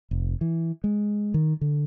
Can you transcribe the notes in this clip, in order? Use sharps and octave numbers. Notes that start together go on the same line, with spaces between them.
F1
E3
G#3
D#3
D3